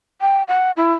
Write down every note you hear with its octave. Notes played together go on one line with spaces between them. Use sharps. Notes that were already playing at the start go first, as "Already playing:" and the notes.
G5
F#5
E4